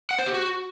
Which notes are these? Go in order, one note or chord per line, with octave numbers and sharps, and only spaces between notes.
F#5
C5
G4
F#4